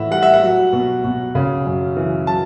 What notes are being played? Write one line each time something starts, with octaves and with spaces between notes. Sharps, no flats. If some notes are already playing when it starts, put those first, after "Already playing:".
Already playing: A2 E3 E5 F#5
G3 F#5
E5
F#5
F#3
B2
B2
C#3
F#2
E3
F#3 A5